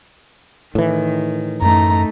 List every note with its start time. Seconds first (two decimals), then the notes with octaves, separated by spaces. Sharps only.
0.75 A2 D#3 E3
1.62 F#2 A3 D#4 A#5